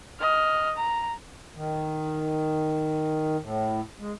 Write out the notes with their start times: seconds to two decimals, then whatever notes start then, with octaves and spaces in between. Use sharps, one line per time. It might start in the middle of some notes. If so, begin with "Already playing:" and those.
0.20 D#5 F6
0.76 A#5
1.56 D#3
3.42 A2
3.99 G#3